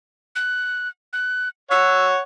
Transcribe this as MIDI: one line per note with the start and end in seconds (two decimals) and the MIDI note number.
0.36 0.89 90
1.13 1.49 90
1.71 2.20 73
1.71 2.20 78
1.71 2.06 88